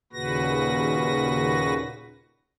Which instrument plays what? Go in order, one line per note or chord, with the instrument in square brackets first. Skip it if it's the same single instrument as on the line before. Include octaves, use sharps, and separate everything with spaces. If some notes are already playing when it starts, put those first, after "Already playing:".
[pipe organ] D#2 A#2 C#3 F#4 B4 A#6